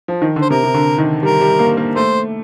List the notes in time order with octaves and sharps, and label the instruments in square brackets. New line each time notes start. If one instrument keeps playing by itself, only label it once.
[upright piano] F3
D#3
D3
[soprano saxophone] C5
[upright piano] C3 [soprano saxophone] A#4
[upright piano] C3
D3
D#3
[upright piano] G3 [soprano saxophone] A#4
[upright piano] G3
A#3
A#3
[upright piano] A3 [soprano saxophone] C5